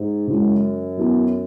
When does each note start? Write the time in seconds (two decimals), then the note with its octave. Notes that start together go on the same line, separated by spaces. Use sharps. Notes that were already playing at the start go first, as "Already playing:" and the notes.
Already playing: G#2
0.27 F#2 C#3 G#3 E4
0.97 F#3 B3 E4